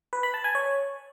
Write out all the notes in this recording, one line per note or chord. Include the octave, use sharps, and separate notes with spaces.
B4
B5
A5
G#5
C#5